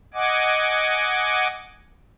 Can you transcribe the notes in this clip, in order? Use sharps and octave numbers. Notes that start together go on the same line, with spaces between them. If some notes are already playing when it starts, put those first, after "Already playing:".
D#5 F#5 G#5 D6